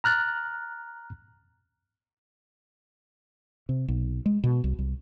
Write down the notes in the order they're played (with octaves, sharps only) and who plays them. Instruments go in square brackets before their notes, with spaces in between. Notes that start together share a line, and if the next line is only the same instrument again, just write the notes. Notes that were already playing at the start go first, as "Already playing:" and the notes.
[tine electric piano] A#5 F6 F#6 A6
[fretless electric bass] C3
B1
G#3
B2
C2
C2